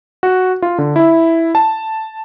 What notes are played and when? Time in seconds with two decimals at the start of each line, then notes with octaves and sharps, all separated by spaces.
0.23 F#4
0.62 F4
0.78 D3
0.96 E4
1.55 A5